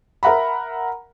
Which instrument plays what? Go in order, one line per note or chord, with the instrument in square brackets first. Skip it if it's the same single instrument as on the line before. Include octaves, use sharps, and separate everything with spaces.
[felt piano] A#4 E5 F#5 A#5 B5